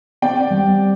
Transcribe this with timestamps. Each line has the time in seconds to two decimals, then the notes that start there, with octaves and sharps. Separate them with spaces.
0.22 C4 D5 G5
0.50 G3